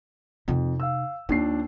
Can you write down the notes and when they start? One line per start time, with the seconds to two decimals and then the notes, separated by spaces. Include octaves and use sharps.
0.48 F2 C3 D#4
0.80 F5 E6
1.29 D#2 C4 D4 F4 C7